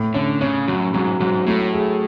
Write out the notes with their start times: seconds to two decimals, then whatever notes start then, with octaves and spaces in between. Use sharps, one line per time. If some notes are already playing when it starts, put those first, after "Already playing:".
Already playing: A2
0.14 D3 C#4
0.41 C#3 C#4
0.68 F#2 F#3
0.94 G#2 F#3
1.20 G#2 F#3
1.47 A2 A3
1.73 G#4